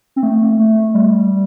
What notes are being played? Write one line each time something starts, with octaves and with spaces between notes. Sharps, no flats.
C4
A3
A3
G3